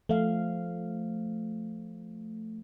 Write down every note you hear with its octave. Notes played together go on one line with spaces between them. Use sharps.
F3 A3 F5